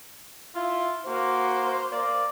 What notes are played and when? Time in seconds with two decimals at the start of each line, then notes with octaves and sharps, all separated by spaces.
0.55 E4 F4
1.08 A#3 F#4 C5
1.92 A#3 D5